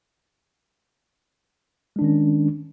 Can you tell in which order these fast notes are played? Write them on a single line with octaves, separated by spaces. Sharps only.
G#3 D4 D#3 C#4